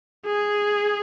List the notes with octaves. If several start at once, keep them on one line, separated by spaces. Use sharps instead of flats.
G#4